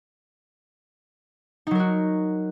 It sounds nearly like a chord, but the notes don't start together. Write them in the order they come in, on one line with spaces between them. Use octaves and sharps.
D#4 F#3 A#4 F#4